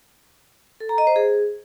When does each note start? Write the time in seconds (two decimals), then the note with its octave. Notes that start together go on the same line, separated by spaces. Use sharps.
0.80 A4
0.89 A#5
0.98 D#5
1.07 C5
1.16 G#4